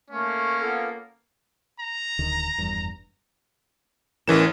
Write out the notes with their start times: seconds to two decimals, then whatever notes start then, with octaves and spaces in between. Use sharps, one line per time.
0.11 A3 A#3 C#4
0.61 B3 F4 A4
1.80 A#5
2.19 D1 D2 D#3
2.58 F1 E2 G2
4.28 A1 E3 C#4 G#4 A#4 E7